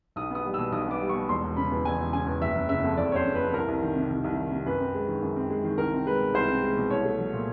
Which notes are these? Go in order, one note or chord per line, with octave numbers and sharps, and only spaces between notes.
B1 D#6
B3 D#6
G3
B2 E6
B1 D#6
B3 D6
G3
B2 C#6
E1 C6
E1
C#3 B5
E2
E1 G#5
E1
C#3 G#5
E2
F#1 E5
F#1
C#3 E5
F2
F#1 D5
F#1 C5 C#5
C#3
B4
F2
C2 A#4
C2
D#3
C3
C2
C2
D#3
C3
F#2 B4
C4
G#3
D#3
F#2
C4
G#3
D#3
C2 A#4
C4
G#3 B4
B2
C2 C5
C4
G#3
B2
C2 C#5
A3
F#3
A#2